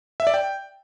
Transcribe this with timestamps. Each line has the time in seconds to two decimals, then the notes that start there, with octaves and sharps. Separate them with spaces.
0.20 E5
0.27 D5
0.34 G5